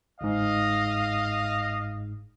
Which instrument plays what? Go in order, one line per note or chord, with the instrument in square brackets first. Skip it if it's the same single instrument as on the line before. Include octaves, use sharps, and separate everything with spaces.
[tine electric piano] G1 G#2 [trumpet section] D#5 F5